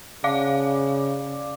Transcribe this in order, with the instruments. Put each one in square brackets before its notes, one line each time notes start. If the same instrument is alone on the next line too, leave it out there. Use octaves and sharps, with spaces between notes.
[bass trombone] C#3 [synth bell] D5 F5 D6